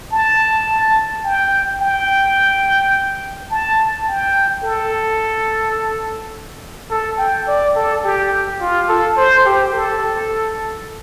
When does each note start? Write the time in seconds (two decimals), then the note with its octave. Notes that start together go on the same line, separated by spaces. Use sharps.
0.12 A5
1.24 G5
1.81 G5
3.51 A5
4.08 G5
4.63 A4
6.90 A4
7.18 G5
7.48 D5
7.75 A4
8.04 G4
8.61 F4
8.89 A4
9.17 C5
9.46 G4
9.73 A4